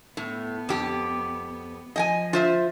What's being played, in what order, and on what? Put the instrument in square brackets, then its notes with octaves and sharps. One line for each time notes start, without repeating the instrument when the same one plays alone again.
[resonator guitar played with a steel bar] A2 [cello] B3
[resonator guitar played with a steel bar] F2 G4
[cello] F3 [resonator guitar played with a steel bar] D#5 G5 G#5
[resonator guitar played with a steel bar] F4 C5 E5